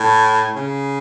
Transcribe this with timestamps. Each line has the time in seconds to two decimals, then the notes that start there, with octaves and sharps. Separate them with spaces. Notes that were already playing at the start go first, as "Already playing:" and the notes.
Already playing: A2
0.55 C#3